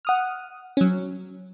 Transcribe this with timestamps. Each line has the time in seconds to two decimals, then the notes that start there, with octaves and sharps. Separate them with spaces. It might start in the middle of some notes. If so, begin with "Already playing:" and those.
0.05 F#5 D#6 F6
0.77 F#3 C#4